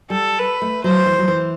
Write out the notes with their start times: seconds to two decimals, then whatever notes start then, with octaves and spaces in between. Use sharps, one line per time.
0.10 G3 A4
0.39 B4
0.62 A3
0.84 F#3 C5
1.06 E3
1.19 F#3
1.28 E3